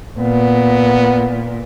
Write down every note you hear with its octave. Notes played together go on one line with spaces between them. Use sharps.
A#2 B3